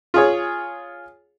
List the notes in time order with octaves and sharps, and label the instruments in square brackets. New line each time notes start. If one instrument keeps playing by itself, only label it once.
[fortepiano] F4 G#4 C#5